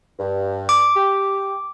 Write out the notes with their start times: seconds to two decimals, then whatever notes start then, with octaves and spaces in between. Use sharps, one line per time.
0.19 G2
0.69 D6
0.95 G4